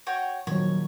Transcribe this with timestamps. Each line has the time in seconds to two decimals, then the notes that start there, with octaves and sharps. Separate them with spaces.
0.07 F#4 C#5 G5
0.47 A#2 D#3 F3 F#3 C#5